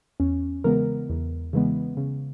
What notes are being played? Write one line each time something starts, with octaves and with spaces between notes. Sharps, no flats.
E2 C#4
C#3 E3 G#3 B3 A#4
E2
C#3 E3 G#3 B3
C#3